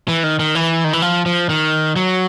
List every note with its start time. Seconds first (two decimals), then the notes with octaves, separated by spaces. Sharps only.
0.08 E3
0.24 D#3
0.39 D#3
0.55 E3
0.84 D#3
0.93 E3
1.02 F3
1.26 F3
1.49 D#3
1.96 F#3